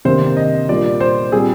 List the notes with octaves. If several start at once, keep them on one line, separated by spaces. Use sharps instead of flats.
C3 D#3 A#3 D4 C5
D#5
A#2 G3 A#3 D4 D5
C5
A#2 G3 C4 G#4